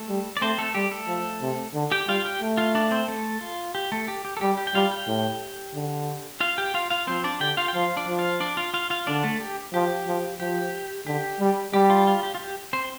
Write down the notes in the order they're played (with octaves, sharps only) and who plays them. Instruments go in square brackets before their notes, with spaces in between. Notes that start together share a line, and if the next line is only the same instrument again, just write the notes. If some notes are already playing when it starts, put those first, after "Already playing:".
Already playing: [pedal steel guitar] A3 A4
[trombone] G3
[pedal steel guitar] D5
[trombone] A3 [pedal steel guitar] C4 C5
[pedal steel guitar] A3 A4
[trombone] G3 [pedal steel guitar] G4
[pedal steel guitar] A3 A4
[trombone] F3
C3
D3
[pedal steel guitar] G4 G5
[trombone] G3 [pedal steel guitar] F4 F5
[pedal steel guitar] G4 G5
[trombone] A3
[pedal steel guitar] F4 F5
D4 D5
C4 C5
A3 A4
F4
G4
A3 A4
G4
G4
A4
[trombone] G3 [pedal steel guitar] G4
[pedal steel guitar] G4
G5
[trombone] G3 [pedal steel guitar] F4 F5
[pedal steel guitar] G4 G5
[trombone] A2
D3
[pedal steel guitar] F4 F5
G4 G5
F4 F5
F4 F5
[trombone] F3 [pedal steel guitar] C4 C5
[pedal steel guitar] D4 D5
[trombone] D3 [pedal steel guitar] G4 G5
[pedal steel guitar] F4 F5
G5
[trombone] F3 [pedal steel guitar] F4 F5
[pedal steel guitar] D4 D5
[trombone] F3
[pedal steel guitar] F4 F5
D4 D5
F4 F5
F4 F5
F4 F5
[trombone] D3 [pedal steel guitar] D4 D5
[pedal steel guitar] A3 A4
G4
[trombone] F3 [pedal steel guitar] G4
[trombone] F3
[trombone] F3 [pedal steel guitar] G4
[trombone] D3 [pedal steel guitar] G4
[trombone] G3
[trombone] G3 [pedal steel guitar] G4
[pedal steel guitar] F4
F4
G4
F4
G4
C4 C5